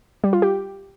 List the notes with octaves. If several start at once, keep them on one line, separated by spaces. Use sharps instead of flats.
G3
F4
G4